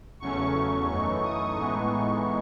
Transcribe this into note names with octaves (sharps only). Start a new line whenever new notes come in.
E2 C#3 F#3 A3 C#4 C#6
F#2 E3 A3 D#4 C#6
D#6
A2 E3 G#3 B3 D#4 C#6